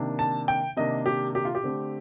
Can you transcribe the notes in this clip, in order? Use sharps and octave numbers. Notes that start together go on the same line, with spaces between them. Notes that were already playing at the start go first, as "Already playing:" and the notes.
Already playing: C3 D#3 A#3 D4
A5
G5
C3 D#3 A#3 D4 D#5
G4
G4
F4
G4
D3 A3 C4